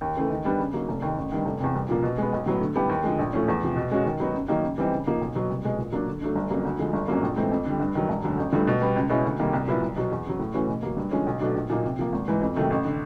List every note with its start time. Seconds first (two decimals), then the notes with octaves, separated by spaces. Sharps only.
0.01 D#2
0.16 C#3 E3 A3
0.31 D#3
0.45 G3 B3 D4
0.59 C#3
0.73 F#3 A#3 D#4
0.89 F1
1.02 D#2 D#3
1.17 A1
1.32 G2 D#3
1.46 F1
1.60 E2 C3
1.75 C2
1.89 A#2 F3 A#3
2.03 B2
2.18 G#3 B3
2.33 B1
2.46 A2 F#3 B3
2.61 D3
2.75 G3 B3 E4 G4
2.89 D#2
3.04 D3 F3 G#3
3.19 A#1
3.33 A2 F3 A3 C#4
3.48 E2
3.62 C3 F3
3.76 B2
3.91 G#3 C#4 F#4
4.06 D#3
4.20 F#3 B3 D#4 F#4
4.34 F#2
4.48 D#3 F#3 A#3 D#4
4.63 C#3
4.78 E3 G3 C4 D#4
4.91 C#3
5.06 F3 A#3 D#4
5.21 B1
5.35 B2 F#3
5.50 C2
5.65 B2 G#3
5.78 A#2
5.92 F#3 A#3 D4
6.07 D3
6.22 F#3 A3 D4
6.35 G1
6.51 F2 C#3 F#3 A#3
6.65 D2
6.79 D3 F3 G#3
6.93 G1
7.08 F2 C#3 F#3 A#3
7.22 A#1
7.36 G#2 E3 A3 C4
7.52 F2
7.66 D3 G3
7.80 G2
7.95 D#3 F#3
8.09 E1
8.24 D2 D3 F#3
8.37 A1
8.52 G2 D3 F3 A3
8.67 B2
8.81 G3 B3
8.96 C#2
9.09 B2 G#3 C#4 E4
9.25 D2
9.38 C3 D#3 G3 A#3
9.53 C2
9.68 A#2 F#3 B3 E4
9.82 C2
9.96 B2 F#3
10.12 E2
10.26 C#3 F#3
10.39 A2
10.54 E3 A3 C#4 F#4
10.68 B2
10.83 F#3 A#3
10.97 G2
11.11 D3 F3 G#3 C#4
11.27 B1
11.40 B2 F#3 A3 D4
11.55 A#1
11.70 A#2 F#3 A#3 D#4
11.84 C3
11.99 F3 A#3
12.12 G#1
12.28 G#2 E3
12.41 F2
12.56 C3 D#3 F#3 A3
12.70 A1
12.85 D3